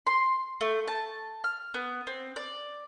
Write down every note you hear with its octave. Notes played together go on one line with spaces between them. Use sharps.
C6
A3
A5
F6
B3
C4
D5